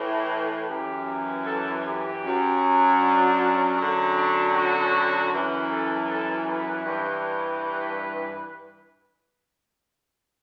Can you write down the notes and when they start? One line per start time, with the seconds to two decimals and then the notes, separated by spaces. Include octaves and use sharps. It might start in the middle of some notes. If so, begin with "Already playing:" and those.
Already playing: A2 E3
0.69 F#2 E3 G4
1.46 A4
1.85 G4
2.23 F#2 F#3
3.01 D4
3.77 F#2 D3 F#3
4.16 D4
4.54 F#4
5.32 F#2 E3
5.70 A4
6.09 A4
6.47 B4
6.85 G2 E3
7.63 B4